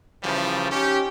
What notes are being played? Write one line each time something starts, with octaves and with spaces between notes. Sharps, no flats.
C#3 E3 F3 G3 A3
C#4 D#4 G4